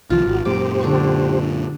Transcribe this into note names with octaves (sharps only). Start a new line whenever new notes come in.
C2 D#3 F3 F4
G#1 F#4
F#2 A#2 G4 C5 D6
D3 D5 C#6